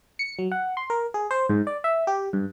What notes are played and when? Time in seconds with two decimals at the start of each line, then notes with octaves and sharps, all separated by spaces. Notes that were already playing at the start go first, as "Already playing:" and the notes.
0.19 C#7
0.39 F#3
0.52 F#5
0.77 C6
0.90 A#4
1.14 G#4
1.31 C5
1.49 G#2
1.67 D5
1.84 E5
2.07 G4
2.33 G2